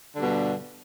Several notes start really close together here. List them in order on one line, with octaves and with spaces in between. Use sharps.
D3 G3 B2 G2